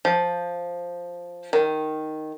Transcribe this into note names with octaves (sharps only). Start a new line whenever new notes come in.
F3
D#3